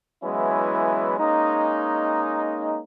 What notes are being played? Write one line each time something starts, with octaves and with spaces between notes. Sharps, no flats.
E3 F#3 G#3 B3 C#4 E4
G#3 A#3 C#4 D#4